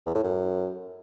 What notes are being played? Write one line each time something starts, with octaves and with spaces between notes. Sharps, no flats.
E2
A2
F#2